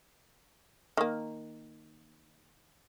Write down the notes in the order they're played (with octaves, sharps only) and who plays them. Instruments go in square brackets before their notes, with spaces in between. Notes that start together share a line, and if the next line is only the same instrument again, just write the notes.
[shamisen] D#3 A#3